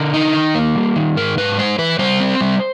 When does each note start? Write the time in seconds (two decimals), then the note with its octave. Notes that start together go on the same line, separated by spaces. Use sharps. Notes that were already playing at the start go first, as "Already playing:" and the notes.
Already playing: D3 A#4
0.14 D#4
0.34 D#3
0.55 A#3
0.76 G3
0.96 D#3
1.17 G#2 A#4
1.37 G#2 B4
1.58 G#3 C5
1.79 E3 B4
1.99 G3 C5
2.20 C4
2.41 G3